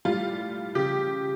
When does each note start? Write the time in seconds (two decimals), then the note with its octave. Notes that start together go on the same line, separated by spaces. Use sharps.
0.05 A2 G3 F4
0.75 C#3 F3 G4